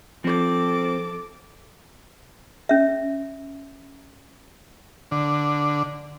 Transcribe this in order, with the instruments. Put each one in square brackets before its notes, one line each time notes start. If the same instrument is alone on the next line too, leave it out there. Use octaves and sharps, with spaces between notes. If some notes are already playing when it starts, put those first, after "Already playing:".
[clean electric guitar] F3 C4 [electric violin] A4 D6
[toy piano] C#4 E5
[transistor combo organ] D3